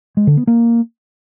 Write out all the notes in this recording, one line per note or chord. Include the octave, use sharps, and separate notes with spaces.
G#3
D3
B3
A#3